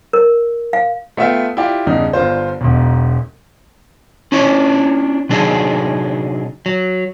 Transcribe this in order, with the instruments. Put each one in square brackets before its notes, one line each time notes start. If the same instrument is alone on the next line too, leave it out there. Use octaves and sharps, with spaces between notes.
[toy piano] A#4
F5
[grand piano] A3 B3 F4 E5 F5 G5
E4 F4 G4 D5
E2 G2 C#3 D#4
G1 G2 F4 C5
E1 B1
[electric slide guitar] C#4 D4 E4 C#5
C3 F#3 D4 D#4 G#4
F#3